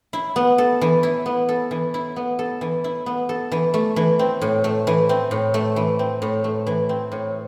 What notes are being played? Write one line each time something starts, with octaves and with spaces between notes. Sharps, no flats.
E4
B3
A4
E3
E4
B3
A4
E3
E4
B3
A4
E3
E4
B3
A4
E3
A3
E3
C4
A2
A3
E3
C4
A2
A3
E3
C4
A2
A3
E3
C4
A2